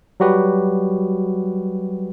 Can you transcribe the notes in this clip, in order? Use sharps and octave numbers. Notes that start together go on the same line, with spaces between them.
F#3 G3 F#4 G4 B4